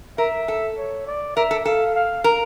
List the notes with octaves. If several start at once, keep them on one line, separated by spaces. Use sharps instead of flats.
A#4 E5
A4
C#5
D5
A#4 E5
A4
A4 F5
F5
A#4